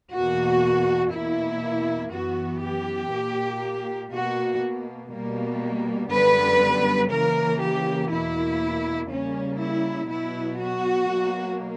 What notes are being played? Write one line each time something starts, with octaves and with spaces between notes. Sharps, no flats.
E2 B2 A#3 F#4
E2 B2 A#3 E4
F#2 E3 B3 F#4
G4
A#2 A#3
B2 A#3 F#4
B2 G3 A#3
F#2 D3 G3 B3 B4
C#3 E3 A#3 A#4
G4
E2 B2 A#3 E4
C#3 G3 A#3 C#4
E4
B2 F#3 B3 E4
F#4
B2 F#3 A#3